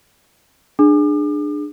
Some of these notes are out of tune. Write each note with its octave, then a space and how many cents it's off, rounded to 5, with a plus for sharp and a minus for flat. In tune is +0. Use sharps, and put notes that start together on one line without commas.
D4 +20 G#4 +0 D6 +40